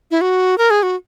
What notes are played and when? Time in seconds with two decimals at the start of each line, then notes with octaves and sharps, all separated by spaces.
0.11 E4
0.21 F#4
0.58 A#4
0.70 G#4
0.83 F#4